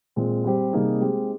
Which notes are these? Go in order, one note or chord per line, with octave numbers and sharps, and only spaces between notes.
A#2 G#3 C4
G3 C4 G4 C5
C3 G3 A#3 D#4 G#4
G#3 C4 G4